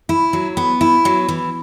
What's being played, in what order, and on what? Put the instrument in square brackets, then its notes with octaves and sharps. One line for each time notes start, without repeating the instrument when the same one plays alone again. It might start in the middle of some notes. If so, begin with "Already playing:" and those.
[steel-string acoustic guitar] E4
F#3
B3
E4
F#3
E3